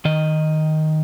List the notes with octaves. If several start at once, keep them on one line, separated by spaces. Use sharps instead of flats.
D#3 D#5